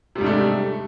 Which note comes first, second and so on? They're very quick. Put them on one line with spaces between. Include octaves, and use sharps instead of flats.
C3 G3 G#2 D4 A3